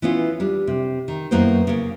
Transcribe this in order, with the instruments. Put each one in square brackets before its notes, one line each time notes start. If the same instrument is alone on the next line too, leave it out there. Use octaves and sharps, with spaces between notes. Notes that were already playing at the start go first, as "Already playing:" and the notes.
[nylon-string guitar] E3 B3 C#4 F4
G3 D4
C3
D#3
F#2 F#3 A#3 B3 E4 C5
C#3 A#3